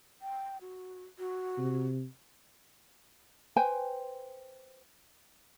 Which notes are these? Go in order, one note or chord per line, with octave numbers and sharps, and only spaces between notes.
G5
F#4
F#4
C3
B4 C5 G5 G#5